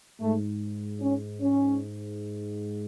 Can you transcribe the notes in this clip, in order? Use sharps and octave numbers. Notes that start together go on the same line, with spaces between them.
G#2 A3
C#4
C#4